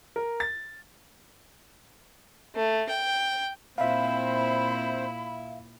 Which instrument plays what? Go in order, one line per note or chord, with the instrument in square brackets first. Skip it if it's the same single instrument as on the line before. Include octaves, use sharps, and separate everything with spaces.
[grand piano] A#4
A6
[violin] A3
G5
[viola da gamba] A#2 E4 [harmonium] C4 C5 [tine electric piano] E5 F5 [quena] B5